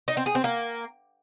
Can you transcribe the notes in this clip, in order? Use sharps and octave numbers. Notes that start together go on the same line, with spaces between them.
D#4
C4
G#4
C4
A#3